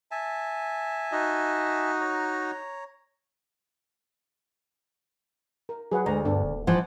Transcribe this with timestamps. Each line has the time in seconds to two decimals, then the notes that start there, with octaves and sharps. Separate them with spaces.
0.11 E5 G#5 A5
1.12 D#4 F#4 D#5
2.01 C#5 A#5
5.69 A#4
5.92 F#3 G#4 B4 F#5
6.06 D2 G#3 A#5
6.25 G2 B3 D4 A4
6.44 D#1
6.67 E3 F3 E4 F#5